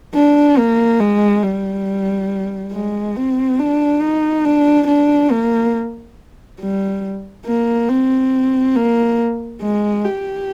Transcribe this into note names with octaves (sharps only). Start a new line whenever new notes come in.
D4
A#3
G#3
G3
G#3
C4
D4
D#4
D4
D4
A#3
G3
A#3
C4
A#3
G#3
G4